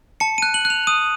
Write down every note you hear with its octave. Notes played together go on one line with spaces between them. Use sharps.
A5 C#7
F#6 D#7
F#7
F#6
F7
D#6 D#7